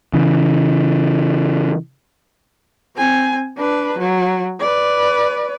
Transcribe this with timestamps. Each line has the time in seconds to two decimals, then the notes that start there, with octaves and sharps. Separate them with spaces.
0.14 C#3 E3
2.96 C4 G#5
3.57 D4 B4
3.98 F#3
4.60 B4 D5